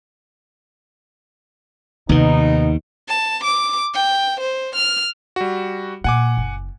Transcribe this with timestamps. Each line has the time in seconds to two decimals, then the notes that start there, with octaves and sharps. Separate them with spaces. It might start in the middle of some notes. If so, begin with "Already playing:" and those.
2.09 D#2 C3 D#3 B3 D#4
3.09 A5
3.44 D6
3.94 G5
4.40 C5
4.75 F6
5.36 G3 F#4
6.04 A#2 F#5 G#5 D6
6.37 F#1